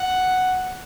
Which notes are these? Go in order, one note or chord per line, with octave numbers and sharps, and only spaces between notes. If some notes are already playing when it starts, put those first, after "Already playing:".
Already playing: F#5